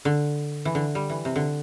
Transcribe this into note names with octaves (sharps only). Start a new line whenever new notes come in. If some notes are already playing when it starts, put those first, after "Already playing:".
D3
E3
D3
G3
E3
C3
D3